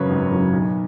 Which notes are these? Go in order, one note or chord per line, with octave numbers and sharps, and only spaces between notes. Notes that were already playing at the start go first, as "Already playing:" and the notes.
Already playing: F#2 C#3 F#3 B4 C#5
G#1
F#2 C#3 F#3
B1